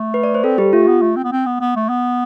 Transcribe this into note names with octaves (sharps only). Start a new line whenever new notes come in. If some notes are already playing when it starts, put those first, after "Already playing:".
Already playing: A3
B4
D5
C5
C4 A4
G3 G4
A3 F4
B3
A3
C4
B3
C4
B3
B3
A3
B3